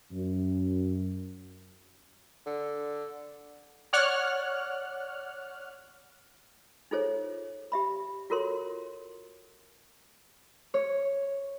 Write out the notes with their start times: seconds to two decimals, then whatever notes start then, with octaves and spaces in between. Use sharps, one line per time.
0.12 F#2
2.46 D3
3.93 C#5 D5 F#5 F6 F#6
6.91 D#4 F4 G#4 A4 C5 C#5
7.72 G4 E5 B5
8.30 F4 F#4 A4 A#4 C#5 C6
10.74 C#5